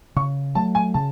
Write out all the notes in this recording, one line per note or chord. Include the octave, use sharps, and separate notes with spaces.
C#3 C#6
F#3 A3 A5
G#5
C#3 A5